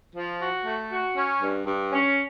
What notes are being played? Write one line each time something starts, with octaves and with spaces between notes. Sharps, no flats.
F3
F#4
A3
F#4
C#4
G2
G2
C#4